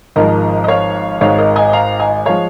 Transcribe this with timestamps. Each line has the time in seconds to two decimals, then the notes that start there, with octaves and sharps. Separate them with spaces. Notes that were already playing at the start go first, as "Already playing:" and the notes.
0.16 G#1 G#2 F3 G#3 A#4 D#5
0.64 D#5
0.68 C#5 F5
1.21 G#1 G#2 G#3 C#5 F5
1.38 A#4 D#5
1.56 D#5 G#5
1.73 F5 A#5
1.99 D#5 G#5
2.26 F3 G#3 C#5 F5